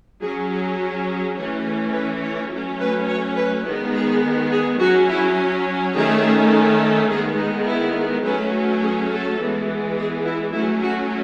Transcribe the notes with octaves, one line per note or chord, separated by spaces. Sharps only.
F#3 C#4 G#4
G#4
G#4
E3 A3 C#4
B4
C#5
F#3 A3 C#4
B4
C#5
B4
D#3 G#3 B3 E4
G#4
G#4
F#3 C#4 F#4
E4
D#3 A3 C#4 G#4
D#3 G#3 B3 G#4
D#4
E4
F#3 A3 C#4 B4
G#4
A4
E3 G#3 B3
G#4
E4
F#3 A3 C#4 E4
F#4